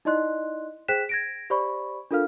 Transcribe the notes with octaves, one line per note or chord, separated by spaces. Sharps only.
D#4 E4 D5 D#5 C6 F#6
G#4 C5 G5 F#6 B6 E7
G#6 A#6 D7
G4 C5 D5 B5 C#6
D4 F4 A4 A#4 F5 F6